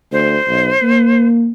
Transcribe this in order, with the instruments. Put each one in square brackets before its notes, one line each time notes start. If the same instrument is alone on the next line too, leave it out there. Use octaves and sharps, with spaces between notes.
[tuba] D2 [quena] C5
[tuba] B1
A#3